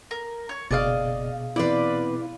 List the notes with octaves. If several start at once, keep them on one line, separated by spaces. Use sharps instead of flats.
A#4
C#5
F#1 B2 G#4 D5 D#5 F5
E2 C4 E4 B4 D5 F5